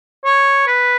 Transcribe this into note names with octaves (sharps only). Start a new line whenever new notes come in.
C#5
B4